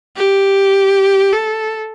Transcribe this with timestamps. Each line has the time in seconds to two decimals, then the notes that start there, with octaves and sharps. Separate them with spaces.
0.16 G4
1.32 A4